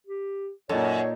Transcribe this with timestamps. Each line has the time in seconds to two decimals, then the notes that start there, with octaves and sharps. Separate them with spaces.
0.07 G4
0.69 F#2 A#2 D#4 A4 C#5